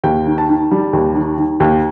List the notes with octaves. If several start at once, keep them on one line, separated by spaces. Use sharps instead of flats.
D#2 G5
D#3
A5
D#3
G3
D#2
D#3
D#3
D#2